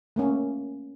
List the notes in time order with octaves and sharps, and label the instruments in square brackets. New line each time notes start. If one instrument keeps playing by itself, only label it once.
[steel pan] A3 A#3 C#4